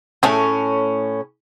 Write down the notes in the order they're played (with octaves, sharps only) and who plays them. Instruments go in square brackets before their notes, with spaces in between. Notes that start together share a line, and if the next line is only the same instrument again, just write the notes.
[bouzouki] A2 C#4 [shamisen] A3 G#4